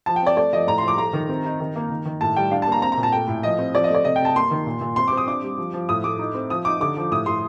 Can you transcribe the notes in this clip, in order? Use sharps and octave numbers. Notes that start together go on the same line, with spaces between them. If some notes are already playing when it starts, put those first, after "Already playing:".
F3 A5
G5
C4 D5
A3 D5
F3 D#5
A2 A#5
C6
F3
D6
A3 A#5
D#3
C4
D#4
D#3
A#3
D#3
D#3
A2 A5
G3 G5
D4 F5
A5
A#3 A#5
C4 A#5
A#5
A#2
A5
A3 G5
A2
F3 D#5
C4
F3 D5
D#5
A3 D5
C3 D#5
G5
C3 A5
A#3 C6
D#3
A#2
A#2
C4 C6
D6
C4
D#6
D4 D6
G3
F3
F3
A2 D#6
A3 D6
D#4
C4
F3 D#6
D#4 D6
D3 D6
F3
A2 D#6
A2 C6